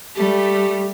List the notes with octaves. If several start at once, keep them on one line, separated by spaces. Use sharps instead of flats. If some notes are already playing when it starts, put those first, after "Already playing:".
G3 A3 G4